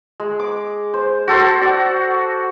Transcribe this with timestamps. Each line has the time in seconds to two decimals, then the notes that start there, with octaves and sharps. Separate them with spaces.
0.20 G#3
0.39 D6
0.94 C5
1.28 F#4 A4 C5
1.61 F#4 D5